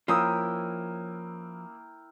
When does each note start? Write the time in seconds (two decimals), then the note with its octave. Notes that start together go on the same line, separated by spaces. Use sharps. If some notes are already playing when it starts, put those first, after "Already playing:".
0.08 F3 A#3 C#4 E4 A#4 G5 D#6 E6